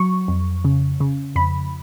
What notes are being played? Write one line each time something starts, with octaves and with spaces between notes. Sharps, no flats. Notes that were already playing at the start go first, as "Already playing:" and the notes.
Already playing: F#3 C#6
F2
C#3
C#3
F2 B5